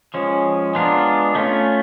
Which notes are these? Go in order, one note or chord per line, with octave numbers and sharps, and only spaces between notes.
F3 G#3 C#4
G#3 B3 D4 F4 A#4
A3 C#4 F4